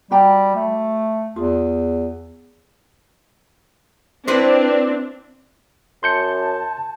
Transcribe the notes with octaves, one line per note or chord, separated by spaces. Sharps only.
G3 F#4 G5 A#5
A3
E2 F4 G#4
C4 D4 E4 B4 C5
F#2 A5 C6 G6 C#7